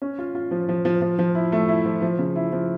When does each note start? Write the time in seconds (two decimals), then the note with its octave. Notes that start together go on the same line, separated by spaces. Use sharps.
0.02 C#4
0.19 F4
0.35 F4
0.51 F3
0.69 F3
0.85 F3
1.02 F3
1.19 F3
1.35 E4
1.52 A3
1.69 E4
1.85 F3
2.02 F3
2.19 C#3
2.36 E4
2.52 F3